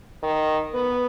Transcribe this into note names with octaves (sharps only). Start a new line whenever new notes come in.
D#3
B3